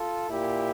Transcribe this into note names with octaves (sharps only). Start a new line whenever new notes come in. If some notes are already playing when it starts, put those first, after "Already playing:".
Already playing: F4 A4
A#2 E4 G4